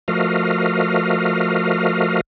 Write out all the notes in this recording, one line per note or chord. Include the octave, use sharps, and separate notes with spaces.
F3 A3 F#4 A#4 D#5 F5